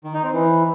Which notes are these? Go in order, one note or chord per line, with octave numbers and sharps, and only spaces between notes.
D#3
D#4
C4
E3